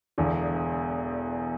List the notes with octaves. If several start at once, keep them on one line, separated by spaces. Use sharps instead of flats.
E1 E2 D3